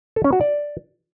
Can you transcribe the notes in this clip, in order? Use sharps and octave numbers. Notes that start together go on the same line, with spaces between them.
A4
C#4
F#4
D5